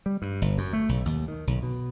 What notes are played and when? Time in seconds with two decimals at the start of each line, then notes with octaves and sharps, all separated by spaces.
0.06 G3
0.22 G2
0.42 G1
0.58 F#2
0.73 A3
0.89 B1
1.05 D#2
1.28 D#3
1.47 B1
1.63 B2